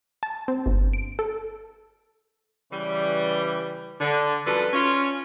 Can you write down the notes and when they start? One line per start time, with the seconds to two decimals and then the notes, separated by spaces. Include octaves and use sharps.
0.23 A5
0.48 C4
0.66 G1
0.93 D7
1.19 A4
2.72 C#3 E3 G3
4.00 D3
4.46 F#2 F3 G3 F#4 A4 B4
4.73 C#4 F4